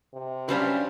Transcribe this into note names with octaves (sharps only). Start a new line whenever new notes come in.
C3
F#3 G3 C#4 D4 B4 C5 F5